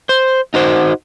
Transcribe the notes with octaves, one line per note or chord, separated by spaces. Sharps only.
C5
D#4 F#4 C5